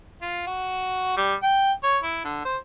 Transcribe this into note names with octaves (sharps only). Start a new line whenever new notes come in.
F4
F#4
G3
G5
C#5
E4
D3
C5